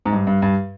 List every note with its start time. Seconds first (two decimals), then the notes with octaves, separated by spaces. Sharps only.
0.05 G#2
0.13 G2
0.27 G2
0.42 G2